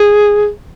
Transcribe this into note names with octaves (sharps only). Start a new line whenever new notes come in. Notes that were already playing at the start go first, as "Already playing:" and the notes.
Already playing: G#4